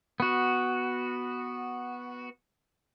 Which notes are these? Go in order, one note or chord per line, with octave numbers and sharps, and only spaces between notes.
B3 F#4